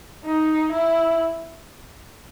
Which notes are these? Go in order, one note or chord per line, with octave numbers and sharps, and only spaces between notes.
D#4
E4